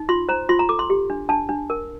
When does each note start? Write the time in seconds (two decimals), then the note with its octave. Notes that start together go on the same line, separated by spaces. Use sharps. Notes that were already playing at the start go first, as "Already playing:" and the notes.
Already playing: D#4
0.09 F4 C6
0.29 C5 A#5
0.49 F4 C6
0.59 A#5
0.69 A4 D6
0.79 C6
0.90 G4
1.10 D4
1.29 D4 A5
1.49 D4
1.70 A#4